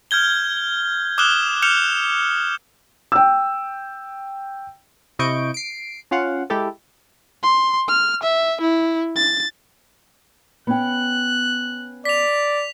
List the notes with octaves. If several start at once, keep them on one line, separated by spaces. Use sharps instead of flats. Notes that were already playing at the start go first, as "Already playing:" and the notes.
F6 G6 G#6 G7
D6 D#6 F6 F#6 E7 G7
F6 G6 C#7 E7 F7 G7
G5 E6
C3 E4 D#5 C#6 G6 D7
C7 D7
C#4 F4 F5 F#5
G#3 E4 G4 A4
C6
F6
E5
E4
A6
B3 C#4 G5 F#6
D5 B6 F7